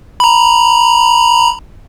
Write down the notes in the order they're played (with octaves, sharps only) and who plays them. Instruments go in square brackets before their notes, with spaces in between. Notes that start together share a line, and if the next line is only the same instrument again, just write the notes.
[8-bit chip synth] A#5 B5